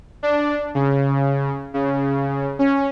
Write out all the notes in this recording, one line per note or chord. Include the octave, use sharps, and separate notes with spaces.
D4
C#3
C#3
C#4